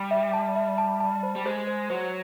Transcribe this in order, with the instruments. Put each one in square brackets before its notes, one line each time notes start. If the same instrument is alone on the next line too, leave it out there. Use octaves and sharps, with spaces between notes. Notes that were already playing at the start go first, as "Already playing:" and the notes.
Already playing: [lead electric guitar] G3
[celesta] E5
A5
E5
A5
A5
C5
[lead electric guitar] G3
[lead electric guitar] G#3 [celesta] C5
[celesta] C5
[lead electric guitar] F#3 [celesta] C5